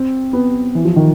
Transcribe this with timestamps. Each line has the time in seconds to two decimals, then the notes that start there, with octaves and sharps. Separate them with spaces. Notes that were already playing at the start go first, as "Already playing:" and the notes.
Already playing: C4
0.33 B3
0.75 E3
0.85 F3
0.96 D#3